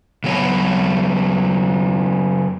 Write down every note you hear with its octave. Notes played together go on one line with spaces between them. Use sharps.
C#3 F#3 B3 C#5